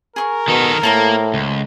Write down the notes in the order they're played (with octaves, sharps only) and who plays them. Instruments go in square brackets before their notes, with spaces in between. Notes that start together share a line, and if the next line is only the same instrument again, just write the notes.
[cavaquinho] G#4 C#6 [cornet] A#4
[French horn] B2 [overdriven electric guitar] D#3 A4
[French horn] A2 [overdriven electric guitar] A#3 [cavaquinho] A4 C5 A#5
[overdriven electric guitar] C#2